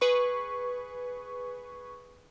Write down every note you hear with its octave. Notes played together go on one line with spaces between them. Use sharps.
G#4 B4 C#6